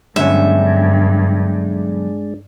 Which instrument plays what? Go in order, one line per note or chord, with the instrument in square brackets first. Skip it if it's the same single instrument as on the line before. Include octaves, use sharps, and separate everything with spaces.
[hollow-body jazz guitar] B1 D3 C#4 [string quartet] G2 [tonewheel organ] G#3 D4 [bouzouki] E5